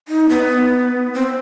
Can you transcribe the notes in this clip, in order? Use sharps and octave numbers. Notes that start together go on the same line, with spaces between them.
D#4
B3
C4